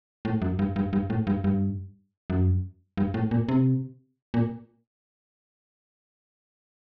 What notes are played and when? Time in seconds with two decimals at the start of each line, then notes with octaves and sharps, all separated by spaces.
0.25 A2
0.42 F#2
0.59 G2
0.76 G2
0.93 G2
1.10 A2
1.27 G2
1.44 G2
2.30 F#2
2.97 G2
3.14 A2
3.31 A#2
3.49 C3
4.34 A#2